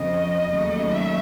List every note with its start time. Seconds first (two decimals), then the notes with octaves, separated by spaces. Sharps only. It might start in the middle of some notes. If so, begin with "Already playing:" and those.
Already playing: F2 C#3 F3 D#5
0.52 D#2 C#3 F#3 A3
0.91 E5